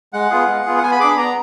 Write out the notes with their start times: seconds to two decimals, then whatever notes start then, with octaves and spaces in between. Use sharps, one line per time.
0.13 G#3 F#5
0.30 B3 F4 G#4
0.47 G#3
0.65 B3 F4 G#4
0.78 F#5
0.82 B3 G#5
0.91 B5
0.99 D4 G#4 D6
1.08 B5
1.17 B3 A#5